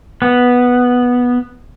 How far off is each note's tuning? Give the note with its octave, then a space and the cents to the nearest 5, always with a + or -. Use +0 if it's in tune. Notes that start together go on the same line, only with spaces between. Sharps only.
B3 -5